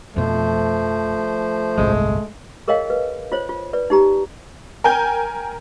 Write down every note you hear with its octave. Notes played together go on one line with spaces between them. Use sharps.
F2 B2 F3 A3 C5
G1 C2 A2 G#3
G#4 A#4 C#5 D#5 F5 G5
B4
F4 C5 C#5
F4
B4 D5
D#4 G4 A#5
A#4 G5 G#5 G6